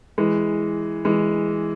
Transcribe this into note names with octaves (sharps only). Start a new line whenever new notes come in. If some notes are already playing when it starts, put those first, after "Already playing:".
E3 G#3
E3 G#3